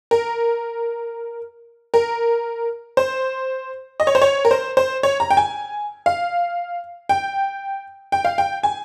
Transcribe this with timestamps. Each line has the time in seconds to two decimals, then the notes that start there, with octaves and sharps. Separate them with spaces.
0.11 A#4
1.94 A#4
2.97 C5
4.00 D#5
4.07 C#5
4.15 C5
4.22 C#5
4.45 A#4
4.51 C5
4.77 C5
5.03 C#5
5.20 A#5
5.30 G5
5.37 G#5
6.06 F5
7.09 G5
8.12 G5
8.25 F5
8.38 G5
8.63 G#5